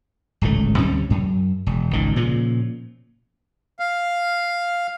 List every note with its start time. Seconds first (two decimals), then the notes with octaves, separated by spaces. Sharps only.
0.42 D1 G#1 C#2 A3
0.78 D2 C3 G3 C#4
1.10 F#2
1.67 E1
1.93 G#1 C#2 D#3
2.16 A#2 C#3 F3
3.80 F5